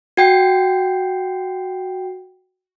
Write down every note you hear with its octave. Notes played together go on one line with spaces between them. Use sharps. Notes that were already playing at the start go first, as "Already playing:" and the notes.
F#4 G5 C7